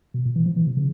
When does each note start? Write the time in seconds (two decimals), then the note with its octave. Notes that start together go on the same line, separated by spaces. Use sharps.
0.14 B2
0.25 A#2
0.36 E3
0.46 F3
0.56 E3
0.67 C3
0.77 C#3